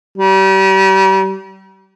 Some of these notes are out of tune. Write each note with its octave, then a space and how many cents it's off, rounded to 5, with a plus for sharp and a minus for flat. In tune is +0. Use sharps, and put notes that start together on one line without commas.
G3 -35